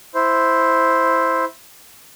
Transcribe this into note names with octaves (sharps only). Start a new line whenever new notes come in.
E4 C5